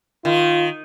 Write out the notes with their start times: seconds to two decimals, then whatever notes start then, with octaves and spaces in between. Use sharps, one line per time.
0.25 D#3 F4